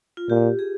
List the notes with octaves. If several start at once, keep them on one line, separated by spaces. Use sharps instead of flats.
F4
A#2 G4
G#4